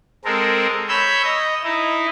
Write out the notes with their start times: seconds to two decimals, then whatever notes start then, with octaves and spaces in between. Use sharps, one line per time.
0.25 G#3 C4 A4 A#4
0.89 C#5 B5 E6 G6
1.24 D#5
1.64 D#4 E4